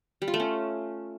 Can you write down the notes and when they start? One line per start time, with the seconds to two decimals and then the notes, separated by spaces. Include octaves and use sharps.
0.22 G3
0.28 F4
0.34 A3
0.40 C#4